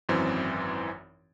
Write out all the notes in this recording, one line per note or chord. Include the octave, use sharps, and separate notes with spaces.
G#1 F#2 E3 C4